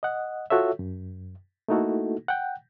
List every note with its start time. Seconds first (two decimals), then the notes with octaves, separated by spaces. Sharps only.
0.03 D#5 F#5
0.50 F4 F#4 A4 C#5 E5
0.79 F#2
1.68 A3 A#3 D#4 E4 F#4 A4
2.28 F#5 G5